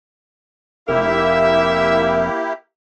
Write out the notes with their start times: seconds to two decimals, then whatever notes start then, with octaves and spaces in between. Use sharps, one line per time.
0.89 F1 A#3 E4 G4 A#4 E5